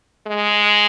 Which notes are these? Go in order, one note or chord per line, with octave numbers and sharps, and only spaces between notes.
G#3